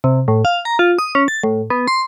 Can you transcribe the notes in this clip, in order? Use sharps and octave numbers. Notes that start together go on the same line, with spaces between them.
C3
A2
F5
A#5
F4
D#6
C#4
A6
A2
B3
C6